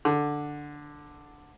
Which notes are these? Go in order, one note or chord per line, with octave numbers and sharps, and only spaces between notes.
D3